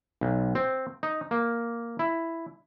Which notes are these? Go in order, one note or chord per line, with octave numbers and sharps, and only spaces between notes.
B1
C4
D#4
A#3
E4